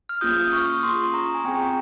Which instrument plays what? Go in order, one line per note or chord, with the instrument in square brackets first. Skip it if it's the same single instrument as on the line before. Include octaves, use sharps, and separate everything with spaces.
[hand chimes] F6
A#3 C#4 F4 G#4 D#6 G6
D#6
C#6 F6
A#3 C#4 F4 G#4 C6 D#6
A#5 C#6
G#5
C4 F4 G#4 G5 A#5